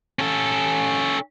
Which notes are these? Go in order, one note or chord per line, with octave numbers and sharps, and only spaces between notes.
C#4 A4